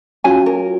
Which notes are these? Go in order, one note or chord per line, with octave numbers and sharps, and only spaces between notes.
F#3 C#4 F4 G#5
A#4